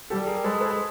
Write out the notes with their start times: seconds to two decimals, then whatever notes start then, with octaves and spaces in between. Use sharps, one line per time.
0.10 G3 G4 A4
0.27 G#4 A#4
0.44 G#3 A4 B4
0.61 A4 B4